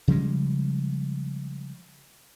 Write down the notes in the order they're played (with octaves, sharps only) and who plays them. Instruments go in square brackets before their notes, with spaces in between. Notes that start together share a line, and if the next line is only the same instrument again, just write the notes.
[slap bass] C#3 F3 G3 G#3